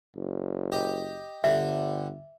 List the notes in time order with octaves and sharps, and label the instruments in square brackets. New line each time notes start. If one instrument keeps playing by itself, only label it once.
[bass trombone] F#1
[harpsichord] G4 D#5
[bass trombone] G1 [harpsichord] D3 G3 [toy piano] E5